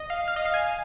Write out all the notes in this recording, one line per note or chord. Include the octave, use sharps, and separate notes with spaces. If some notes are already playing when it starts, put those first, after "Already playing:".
Already playing: D#5
F5
F5
D#5
F5
G#5